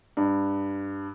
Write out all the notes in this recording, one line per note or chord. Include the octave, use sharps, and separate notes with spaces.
G2